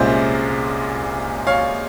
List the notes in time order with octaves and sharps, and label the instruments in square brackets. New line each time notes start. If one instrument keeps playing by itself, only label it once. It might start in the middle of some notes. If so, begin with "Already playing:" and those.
Already playing: [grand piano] C2 A#2 G#3 C#4 C5 E5
C#5 F5